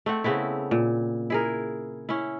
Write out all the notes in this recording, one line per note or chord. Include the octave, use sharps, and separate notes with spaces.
A3 C4 F#5
C#3 B3 C4 E4
A#2
E4 G#4 A#4
C#4 E4